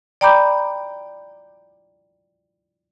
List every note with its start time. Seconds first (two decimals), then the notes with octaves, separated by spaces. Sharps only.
0.21 D5 G5 A#5 B5 D6 G6